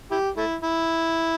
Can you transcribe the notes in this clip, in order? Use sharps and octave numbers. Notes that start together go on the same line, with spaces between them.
E4 G4
A3 E4
E4